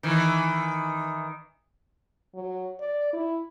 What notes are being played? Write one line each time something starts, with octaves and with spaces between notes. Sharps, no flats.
D#3 E3
F#3
D5
E4